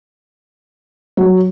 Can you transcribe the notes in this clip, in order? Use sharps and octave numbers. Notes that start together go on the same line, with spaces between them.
F#3